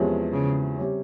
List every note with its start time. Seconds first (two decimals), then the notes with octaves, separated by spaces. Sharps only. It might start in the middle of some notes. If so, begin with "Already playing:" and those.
Already playing: E2 C3 F3 G#3 C#4
0.33 C#3
0.78 C3 G3 C#4